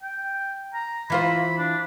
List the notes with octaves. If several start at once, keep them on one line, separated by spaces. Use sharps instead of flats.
G5
A#5
E3 F4 C5 B5
D4